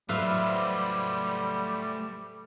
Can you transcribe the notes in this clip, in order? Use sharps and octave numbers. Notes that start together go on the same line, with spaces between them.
A2 F#3 G3 A3 B4 C5 E5 F5